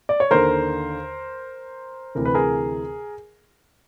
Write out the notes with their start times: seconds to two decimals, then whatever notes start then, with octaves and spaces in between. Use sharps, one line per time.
0.09 D5
0.20 C#5
0.31 D#2 D3 A#4 C5
2.15 D2 C3 E3 A#4
2.25 B4
2.34 G#4 A#4